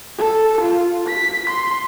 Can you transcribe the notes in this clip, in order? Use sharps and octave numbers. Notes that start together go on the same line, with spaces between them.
A4
F4
B6
C6